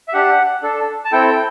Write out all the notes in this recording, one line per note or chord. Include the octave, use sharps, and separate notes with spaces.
E5
D4 G4 F#5
D4 A4
A5
C4 E4 A4 G5